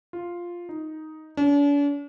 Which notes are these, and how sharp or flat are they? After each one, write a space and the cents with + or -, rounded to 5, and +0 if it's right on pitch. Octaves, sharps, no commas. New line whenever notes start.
F4 +0
D#4 +5
D4 -45